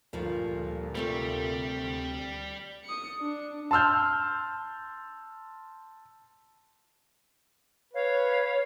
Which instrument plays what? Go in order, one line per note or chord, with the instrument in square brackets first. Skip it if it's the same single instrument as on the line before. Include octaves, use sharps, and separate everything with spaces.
[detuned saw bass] D2 [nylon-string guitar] G2 F3 A3 [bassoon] A#2
[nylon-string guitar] C3 A3 C4 [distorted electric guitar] G3
[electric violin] D#6 C#7
D4
[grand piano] A5 C6 E6 F6 G6
[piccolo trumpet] B4 [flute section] C#5 F5